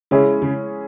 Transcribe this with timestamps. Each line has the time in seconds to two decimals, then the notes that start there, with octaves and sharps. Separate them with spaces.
0.11 C#3 G#3 C#4 E4 G#4
0.42 C#3